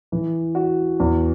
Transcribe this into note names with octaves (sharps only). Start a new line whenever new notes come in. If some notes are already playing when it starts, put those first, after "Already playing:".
E3
F#4
E2